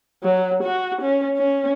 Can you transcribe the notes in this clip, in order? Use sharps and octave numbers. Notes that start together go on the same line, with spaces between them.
F#3
F#4
C#4
C#4